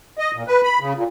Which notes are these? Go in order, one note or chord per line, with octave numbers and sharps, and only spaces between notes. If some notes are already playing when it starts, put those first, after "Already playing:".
D#5
A#2
B4
B5
C#3
A#2